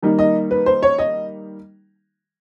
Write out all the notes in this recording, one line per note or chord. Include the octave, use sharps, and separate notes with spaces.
D#3 G3 A#3 D#4
D#5
B4
C5
C#5
D#5